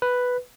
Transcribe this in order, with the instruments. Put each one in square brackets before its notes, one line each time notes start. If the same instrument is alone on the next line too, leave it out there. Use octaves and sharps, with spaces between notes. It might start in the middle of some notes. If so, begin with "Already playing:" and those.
[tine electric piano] B4